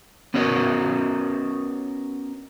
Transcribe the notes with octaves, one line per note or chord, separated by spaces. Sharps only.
B3 C#4 F#4 A#4 C#5 D#5